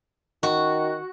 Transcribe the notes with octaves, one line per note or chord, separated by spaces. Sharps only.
D#3 F#4